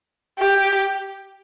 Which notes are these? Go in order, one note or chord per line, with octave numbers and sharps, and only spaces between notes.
G4